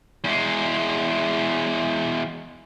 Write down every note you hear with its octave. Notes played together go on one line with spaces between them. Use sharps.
E2 G#3